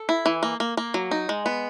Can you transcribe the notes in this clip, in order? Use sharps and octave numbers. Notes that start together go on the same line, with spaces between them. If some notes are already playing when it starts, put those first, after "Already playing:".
Already playing: A4
E4
E3
A#3
A#3
A#3
F#3
D#4
G#3
B3